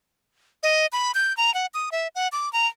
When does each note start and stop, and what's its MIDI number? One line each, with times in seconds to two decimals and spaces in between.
0.63 0.86 75
0.92 1.12 83
1.15 1.35 91
1.37 1.53 82
1.54 1.66 78
1.74 1.90 87
1.92 2.08 76
2.15 2.28 78
2.32 2.51 86
2.53 2.67 82